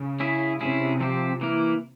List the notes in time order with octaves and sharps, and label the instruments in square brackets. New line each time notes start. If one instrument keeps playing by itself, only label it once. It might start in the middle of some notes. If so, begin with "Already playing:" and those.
Already playing: [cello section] C#3
[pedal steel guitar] C#4 E4 G#4 E5
[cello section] C3 [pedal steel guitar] C#4 E4 G#4 E5
[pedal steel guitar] F3 C4 G4 C5
E3 A#3 E4 A#4